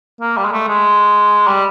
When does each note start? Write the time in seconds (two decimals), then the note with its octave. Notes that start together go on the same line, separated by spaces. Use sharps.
0.21 A#3
0.37 G3
0.45 G#3
0.52 A3
0.68 G#3
1.47 G3